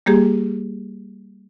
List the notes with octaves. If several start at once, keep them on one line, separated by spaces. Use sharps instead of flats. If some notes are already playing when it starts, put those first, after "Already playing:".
G3 A#3 G4 G#4